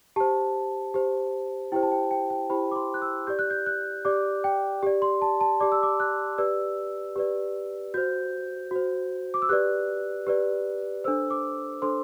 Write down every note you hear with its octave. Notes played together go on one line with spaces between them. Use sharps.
G4 C5 A5
G4 C5
E4 G4 C5 G5
A5
G5
G5
G5
E4 G4 C5 B5
D6
C6
F#6
E6
G4 D5 G6
F#6
G6
F#6
G4 D5 D6
G5
G4 D5
C6
A5
A5
G4 D5 D6
E6
D6
F#6
G4 B4 D5 E6
G4 B4 D5
F#4 C5 G6
F#4 C5
D6
E6
G4 B4 D5 F#6
G4 B4 D5
D4 A4 C5 E6
D6
D4 A4 C5 C6